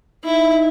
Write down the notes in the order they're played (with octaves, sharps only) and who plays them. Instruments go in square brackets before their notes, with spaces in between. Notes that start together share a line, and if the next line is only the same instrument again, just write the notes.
[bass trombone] D#4 [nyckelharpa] E4